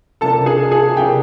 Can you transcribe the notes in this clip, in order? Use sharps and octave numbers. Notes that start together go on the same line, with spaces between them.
C3 F3 A#3 D4 A4 A5
G#4 G#5
G#4 G#5
C3 F3 A#3 D4 G4 G5